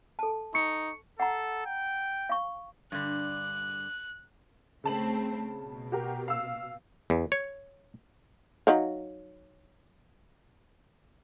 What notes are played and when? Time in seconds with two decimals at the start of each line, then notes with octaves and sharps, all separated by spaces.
0.19 A4 A5
0.54 D#4 C#6 C#7
1.20 A4 F#5 A#5
1.66 G5
2.29 F5 C#6
2.92 G2 D3 F#6
4.84 C#3 A3 C4 A5 F#7
5.63 B2
5.92 F#4 G4 A#4
6.28 F5 E6
7.10 E2
7.32 C#5
8.67 F#3 D#4 F5